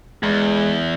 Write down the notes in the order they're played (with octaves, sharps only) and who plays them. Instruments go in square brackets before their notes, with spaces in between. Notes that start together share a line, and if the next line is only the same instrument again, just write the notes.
[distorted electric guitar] E2 [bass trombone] G#3